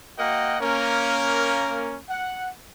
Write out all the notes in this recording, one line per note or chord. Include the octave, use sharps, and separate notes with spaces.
A#3 F#4 A#4 D#5 F#5 G5
A#3 C#4 A#4
F#5